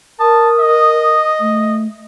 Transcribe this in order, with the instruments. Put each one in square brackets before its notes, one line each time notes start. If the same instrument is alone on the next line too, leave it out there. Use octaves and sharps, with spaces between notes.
[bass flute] A#4 [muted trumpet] A5 [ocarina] D#6
[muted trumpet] D#5
[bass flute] A3